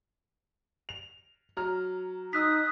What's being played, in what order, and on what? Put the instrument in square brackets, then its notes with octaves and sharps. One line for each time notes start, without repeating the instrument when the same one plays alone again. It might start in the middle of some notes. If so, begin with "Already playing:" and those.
[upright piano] F7
F#3 A#5 F6
[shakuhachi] D#4 [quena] D#6 [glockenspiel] E6 F#6 B6